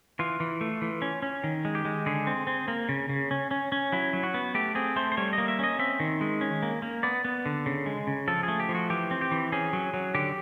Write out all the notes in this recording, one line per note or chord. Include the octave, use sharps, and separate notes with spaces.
E3 F4
E3
A3
E3
C#4
C#4
D#3
G#3
G4
G#3
D3 G#4
C4
C4
A#3
C#3
C#3
C#4
C#4
C#4
F#3 E4
F#3
F#4
B3
A3 G4
C4 G#4
A3 C5
C5
G3 C#5
D#5
A#3
E5
C#4 D#5
C4 E5
D#3
G#3
C#4
A#3
A#3
B3 D5
B3
D3
C#3
G#3
C#3
F3 A4
G#4
A3
G4
F3
F#4
E3 G4
C4
G4
E3
C#4 G#4
F#3
F#3
D3 G4